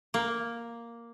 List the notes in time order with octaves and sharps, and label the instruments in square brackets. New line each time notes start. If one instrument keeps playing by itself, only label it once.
[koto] A#3